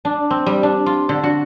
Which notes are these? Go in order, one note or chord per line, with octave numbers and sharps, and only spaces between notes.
D4
C4
G3
D4
F4
D3
F#4